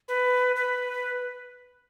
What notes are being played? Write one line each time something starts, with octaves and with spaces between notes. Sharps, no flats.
B4
B4